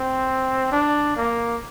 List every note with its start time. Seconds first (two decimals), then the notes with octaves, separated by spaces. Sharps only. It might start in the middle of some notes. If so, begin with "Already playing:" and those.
Already playing: C4
0.72 D4
1.16 A#3